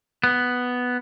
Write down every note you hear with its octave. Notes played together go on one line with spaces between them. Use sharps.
B3